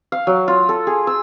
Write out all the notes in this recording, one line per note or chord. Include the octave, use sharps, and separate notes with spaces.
F5
F#3
F4
A4
G#4
E6